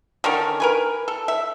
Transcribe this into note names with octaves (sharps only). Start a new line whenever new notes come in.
D3 D#3 C#4 A#4
A#4 B4 G#5
A4
E5